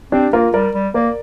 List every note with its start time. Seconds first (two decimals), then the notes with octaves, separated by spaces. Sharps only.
0.12 C4 D4 G4
0.33 A#3 F4 A#4
0.54 G3 A#4 D5
0.74 G3
0.94 A#3 A#4 D5